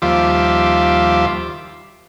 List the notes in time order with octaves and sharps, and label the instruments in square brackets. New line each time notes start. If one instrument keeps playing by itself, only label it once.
[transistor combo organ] D#2 F3 G3 F4 E5 D6